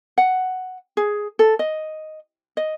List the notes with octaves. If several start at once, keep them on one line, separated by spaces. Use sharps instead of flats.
F#5
G#4
A4
D#5
D#5